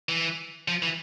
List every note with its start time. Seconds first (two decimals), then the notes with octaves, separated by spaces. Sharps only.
0.09 E3
0.68 F3
0.82 E3